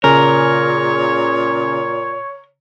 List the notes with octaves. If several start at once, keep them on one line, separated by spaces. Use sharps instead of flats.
A#2 C#3 A#4 C#5 G#5